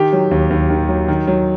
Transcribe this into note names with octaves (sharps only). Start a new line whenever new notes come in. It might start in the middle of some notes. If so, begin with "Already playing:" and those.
Already playing: D#3 G4
F#3
D#2
D#2
D#3
F#3
D#3
F#3